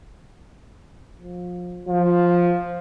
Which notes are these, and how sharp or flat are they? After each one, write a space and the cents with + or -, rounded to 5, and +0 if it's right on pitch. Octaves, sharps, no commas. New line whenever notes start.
F3 +25
F3 +5